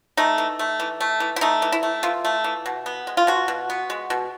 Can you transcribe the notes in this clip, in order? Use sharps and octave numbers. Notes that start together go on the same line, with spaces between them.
A3 D#4
E3
A3
E3
A3
E3
E4
A3 D#4
E3
E4
A3
E3 F4
A3
E3
B2
B3
G#3
F4
B2 F#4
B2
B3
G#3
B2